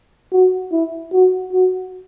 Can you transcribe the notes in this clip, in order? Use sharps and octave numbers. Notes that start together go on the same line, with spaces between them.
F#4
E4
F#4
F#4